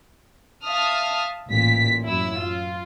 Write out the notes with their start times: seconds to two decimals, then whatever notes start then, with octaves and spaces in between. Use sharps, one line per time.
0.65 E5 F5 A5 D#6 F6
1.49 A1 A#2 B6
2.05 F#2 E4 E6
2.40 F4